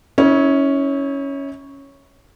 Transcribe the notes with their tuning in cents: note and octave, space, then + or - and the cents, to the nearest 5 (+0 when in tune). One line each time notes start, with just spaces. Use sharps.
C#4 +0 E4 -40 C#5 +0